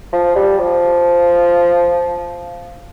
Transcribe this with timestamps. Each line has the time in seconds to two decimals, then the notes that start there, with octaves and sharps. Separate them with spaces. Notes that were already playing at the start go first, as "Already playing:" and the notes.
0.13 F3
0.35 G3
0.59 F3